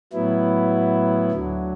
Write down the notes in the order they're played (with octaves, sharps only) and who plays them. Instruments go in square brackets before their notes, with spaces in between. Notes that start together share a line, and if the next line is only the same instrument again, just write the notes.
[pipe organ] A2 F#3 B3 E4
D2 D3 F#3